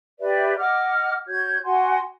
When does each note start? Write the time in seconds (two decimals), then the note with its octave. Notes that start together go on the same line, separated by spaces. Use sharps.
0.20 G4 B4 D5 E5
0.57 D#5 F#5 D6 F6
1.28 F#4 C#5 G6 G#6
1.64 F#4 F#5 G#5 C6